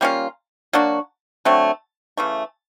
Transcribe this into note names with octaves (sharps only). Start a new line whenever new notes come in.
G3 A#3 C#4 F4
F#3 A#3 D4 F#4
D3 F#3 A3 C4
C#3 E3 A3